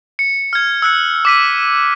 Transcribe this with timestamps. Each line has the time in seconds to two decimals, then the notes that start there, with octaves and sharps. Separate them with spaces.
0.19 C#7
0.53 F6 G#6
0.82 E6 F#6 C#7
1.25 D6 B6 D#7